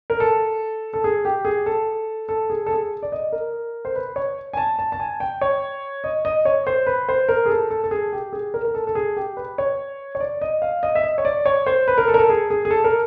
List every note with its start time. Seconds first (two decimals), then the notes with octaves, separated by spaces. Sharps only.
0.10 A#4
0.20 A4
0.93 A4
1.04 G#4
1.25 G4
1.45 G#4
1.66 A4
2.29 A4
2.50 G#4
2.66 A4
2.71 G#4
3.03 D5
3.12 D#5
3.32 A#4
3.85 C5
3.96 B4
4.16 C#5
4.53 G#5
4.57 A5
4.79 A5
4.92 A5
5.00 G#5
5.20 G5
5.41 C#5
6.04 D#5
6.25 D#5
6.45 C#5
6.67 C5
6.87 B4
7.09 C5
7.29 A#4
7.46 G#4
7.50 A4
7.70 A4
7.84 A4
7.91 G#4
8.12 G4
8.33 G#4
8.54 A#4
8.65 A#4
8.75 A4
8.87 A4
8.95 G#4
9.17 G4
9.37 B4
9.58 C#5
10.15 C#5
10.20 D5
10.41 D#5
10.62 F5
10.83 D#5
10.95 E5
11.03 D#5
11.18 C#5
11.25 D5
11.46 C#5
11.66 C5
11.88 B4
11.98 A#4
12.08 A4
12.14 A#4
12.19 A4
12.30 G#4
12.50 G#4
12.65 G#4
12.71 A4
12.84 A#4